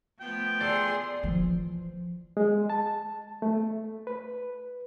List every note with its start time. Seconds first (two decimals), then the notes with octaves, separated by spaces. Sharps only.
0.20 F3 A3 B3 G5
0.61 G#4 A4 D5 C6
1.23 E3 F3
2.37 G#3
2.70 A5
3.42 A3
4.07 B4